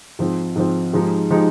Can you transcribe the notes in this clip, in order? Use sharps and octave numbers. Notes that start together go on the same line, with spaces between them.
G#2 F3 C4
G#2 F3 C4
G#2 F3 G#3 D#4 G4
F3 G#3 D#4 G4